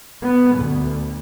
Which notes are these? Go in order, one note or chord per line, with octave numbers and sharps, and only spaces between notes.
B3
D2